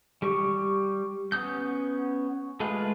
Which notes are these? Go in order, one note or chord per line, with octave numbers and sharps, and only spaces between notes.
G3 G4 C#6
B3 C#4 D#6 G6
G#3 A3 F4 G#4 B4